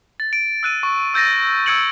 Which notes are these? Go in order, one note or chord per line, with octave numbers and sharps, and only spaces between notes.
A6
D7
E6 F#6 D#7
C#6
E6 G6 A6 A#6 D#7
E6 G6 G#6 C#7 D7 F#7